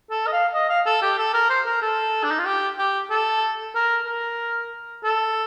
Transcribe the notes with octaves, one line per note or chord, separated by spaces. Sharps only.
A4
D#5
F5
D#5
F5
A4
G4
A4
A#4
C5
A#4
A4
D4
D#4
F4
G4
G4
A4
A#4
A#4
A4